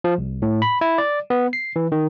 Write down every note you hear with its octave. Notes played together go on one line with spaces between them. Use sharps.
F3
C2
A2
B5
E4
D5
B3
C7
E3
D#3